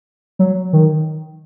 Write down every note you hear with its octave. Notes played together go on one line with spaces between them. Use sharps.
F#3
D#3